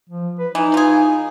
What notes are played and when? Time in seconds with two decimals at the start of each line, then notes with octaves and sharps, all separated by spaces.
0.09 F3
0.39 B4
0.55 E3 D#4
0.74 F4 G#4